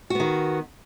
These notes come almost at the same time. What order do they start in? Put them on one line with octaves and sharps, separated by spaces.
F#4 B3 D#3